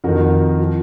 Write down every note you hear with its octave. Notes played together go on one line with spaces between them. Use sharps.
F2 D#3 F#4 A#4
F3